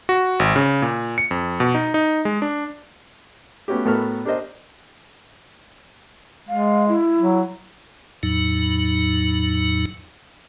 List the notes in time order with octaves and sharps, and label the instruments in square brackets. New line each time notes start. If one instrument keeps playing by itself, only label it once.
[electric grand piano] F#4
G#1
C#3
A#2
C#7
F2
B2
D#4
D#4
G#3
D4
[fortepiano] A3 B3 C#4 F#4 G4
A2 B3 F#4 A4 A#4 F6
D4 G4 A#4 C5 D#5
[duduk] G#3 [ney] F5
[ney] E4
[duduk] F#3
[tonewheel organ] E2 A2 F#3 D#4